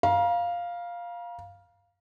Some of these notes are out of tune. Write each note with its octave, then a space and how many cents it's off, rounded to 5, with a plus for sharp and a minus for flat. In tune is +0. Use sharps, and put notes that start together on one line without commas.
F5 +0 A#5 +40